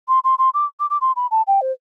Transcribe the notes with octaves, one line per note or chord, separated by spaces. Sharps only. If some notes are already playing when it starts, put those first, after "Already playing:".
C6
C6
C6
D6
D6
D6
C6
B5
A5
G5
C5